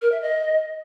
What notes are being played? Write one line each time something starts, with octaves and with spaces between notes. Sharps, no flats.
A#4
E5
D#5